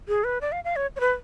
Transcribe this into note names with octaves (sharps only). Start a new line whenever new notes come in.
G#4
B4
D5
F5
F5
C#5
C#5
B4